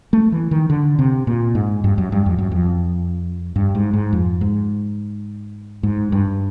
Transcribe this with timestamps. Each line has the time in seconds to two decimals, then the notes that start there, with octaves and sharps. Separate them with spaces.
0.13 A3
0.32 E3
0.51 D#3
0.70 D3
0.99 C3
1.27 A#2
1.55 G#2
1.84 G2
1.98 F#2
2.12 G2
2.26 F2
2.39 F#2
2.52 F2
3.56 G2
3.75 G#2
3.94 G#2
4.13 F2
4.41 G#2
5.83 G#2
6.12 G2